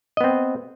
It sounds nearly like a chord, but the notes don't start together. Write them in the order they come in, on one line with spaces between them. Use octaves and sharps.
D#5 B3 C4